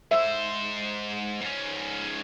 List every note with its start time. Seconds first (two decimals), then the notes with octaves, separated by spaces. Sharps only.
0.11 G#2 C5 E5
1.41 G#2 C#4